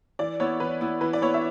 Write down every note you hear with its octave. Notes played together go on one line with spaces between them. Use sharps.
E3 D5
B3 E4 C#5
E3 B4
B3 E4
E3 B4
D5
B3 E4 C#5
E5